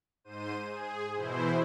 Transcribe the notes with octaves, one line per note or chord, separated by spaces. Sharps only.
G#2 C5 D#7
G#4
B2 E3 E4 C5